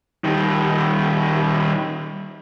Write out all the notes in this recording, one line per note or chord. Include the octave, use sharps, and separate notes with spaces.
D#3 G3